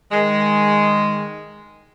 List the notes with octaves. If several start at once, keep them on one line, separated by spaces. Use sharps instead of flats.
D#3 G#3